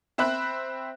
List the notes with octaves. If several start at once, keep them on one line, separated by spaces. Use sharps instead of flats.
C4 C5 E5 B5 F#6